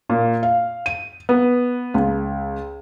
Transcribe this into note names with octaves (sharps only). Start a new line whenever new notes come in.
A#2
F5
D#7
B3
C#2